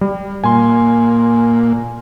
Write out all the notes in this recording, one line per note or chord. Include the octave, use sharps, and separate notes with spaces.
G3
A#2 G#5 C6